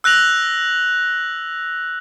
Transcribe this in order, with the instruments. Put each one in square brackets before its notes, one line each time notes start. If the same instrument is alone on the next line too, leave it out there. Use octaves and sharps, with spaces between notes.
[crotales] E6 F#6 A#6 F7 F#7